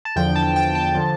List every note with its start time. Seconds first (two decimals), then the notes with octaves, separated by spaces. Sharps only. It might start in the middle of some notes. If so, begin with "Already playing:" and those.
0.05 A5
0.16 E2 D3 F3 G5
0.36 A5
0.56 G5
0.75 A5
0.95 D3 F3